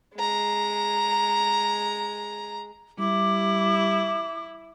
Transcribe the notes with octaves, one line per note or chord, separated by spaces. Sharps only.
G#3 A#5
G3 E4 D6